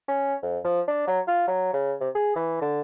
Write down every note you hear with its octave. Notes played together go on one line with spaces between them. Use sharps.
C#4
F2
F3
D4
F#3
F4
F#3
C#3
C3
G#4
E3
D3